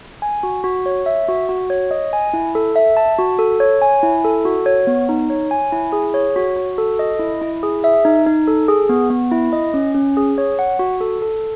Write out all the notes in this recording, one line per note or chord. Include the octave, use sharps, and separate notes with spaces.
G#5
F#4
F#4
C#5
E5
F#4
F#4
C#5
D#5
G#5
E4
A4
E5
A5
F#4
A4
C#5
G#5
E4
A4
F#4
C#5
B3
D#4
C#5
G#5
E4
G#4
C#5
F#4
F#4
A4
D#5
E4
E4
G#4
E5
D#4
D#4
A4
G#4
B3
B3
E4
D#5
C#4
C#4
G#4
C#5
F#5
F#4
A4
A4